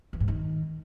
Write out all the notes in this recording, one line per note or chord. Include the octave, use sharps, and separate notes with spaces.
E3
G#2
D#3